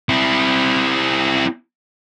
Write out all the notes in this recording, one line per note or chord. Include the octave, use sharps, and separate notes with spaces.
C4 E4